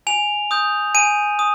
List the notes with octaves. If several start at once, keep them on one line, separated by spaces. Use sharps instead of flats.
G#5 F7
D#6 G6
G#5 D#7
D#6